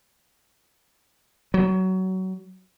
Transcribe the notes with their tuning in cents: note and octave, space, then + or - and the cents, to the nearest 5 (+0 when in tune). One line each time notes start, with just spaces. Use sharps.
F#3 +20